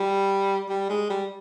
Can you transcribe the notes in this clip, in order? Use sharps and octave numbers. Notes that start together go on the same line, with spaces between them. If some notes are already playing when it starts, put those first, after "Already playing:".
Already playing: G3
G3
G#3
G3